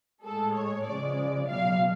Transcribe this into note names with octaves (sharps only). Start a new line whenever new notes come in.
A2 G#3 A4
C#5
C#3 F3 G#3 D5
B2 F#3 F5